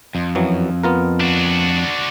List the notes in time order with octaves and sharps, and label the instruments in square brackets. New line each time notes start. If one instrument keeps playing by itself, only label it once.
[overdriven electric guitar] F2
[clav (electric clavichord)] F#2 E3 F#3
B3 F4 A#4
[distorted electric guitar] D4 F#4